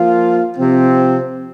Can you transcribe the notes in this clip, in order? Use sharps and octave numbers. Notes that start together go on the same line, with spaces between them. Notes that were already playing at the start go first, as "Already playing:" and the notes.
Already playing: F3 A#3 F4
C3 F3 C4